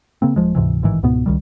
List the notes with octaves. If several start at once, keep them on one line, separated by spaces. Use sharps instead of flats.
C#3 A#3 C4
D#1 C2 F3 G#3
D2 G#2 C3 E3
A1 G#2 D#3 E3
C#2 G#2 B2 B3
C#2 D#3 G3